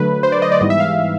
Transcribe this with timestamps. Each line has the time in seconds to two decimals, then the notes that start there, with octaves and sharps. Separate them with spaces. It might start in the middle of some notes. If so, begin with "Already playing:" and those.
Already playing: D3 F#3 A3 B4
0.23 C5
0.32 D5
0.42 D#5
0.52 D5
0.61 G#2 E3 G3 B3 D#5
0.70 E5
0.80 F5